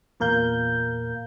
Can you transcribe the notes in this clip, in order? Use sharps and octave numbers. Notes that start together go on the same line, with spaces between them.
E2 A#2 A#4 F5 G6